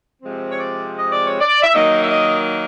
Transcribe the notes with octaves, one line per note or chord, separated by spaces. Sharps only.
C3 F3 G#3 C4
C#5
D5
D#5
D5
C#5
D5
E5
D#3 F#3 A#3 D#4 D#5
E5
D#5